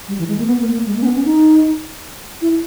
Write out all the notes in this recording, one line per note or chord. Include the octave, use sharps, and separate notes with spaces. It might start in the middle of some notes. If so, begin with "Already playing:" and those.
G3
E3
G#3
A#3
B3
A#3
A#3
G#3
A#3
C#4
B3
C#4
D#4
E4